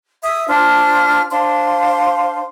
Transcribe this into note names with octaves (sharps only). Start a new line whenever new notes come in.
E5 D#6 E6
D4 F4 C5 F6
D4 C5 F5 C6